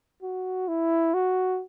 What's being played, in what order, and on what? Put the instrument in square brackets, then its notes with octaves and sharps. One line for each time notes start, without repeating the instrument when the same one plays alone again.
[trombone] F#4
E4
F#4